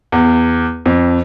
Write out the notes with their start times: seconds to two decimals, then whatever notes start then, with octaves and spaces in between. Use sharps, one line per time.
0.12 E2
0.86 F2